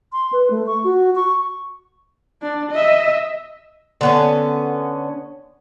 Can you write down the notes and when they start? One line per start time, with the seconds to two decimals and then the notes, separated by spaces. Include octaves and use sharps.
0.13 C6
0.33 B4
0.50 A3
0.67 C#6
0.84 F#4
1.16 C#6
2.42 D4
2.71 D#5 E5
4.01 D3 B3 C#4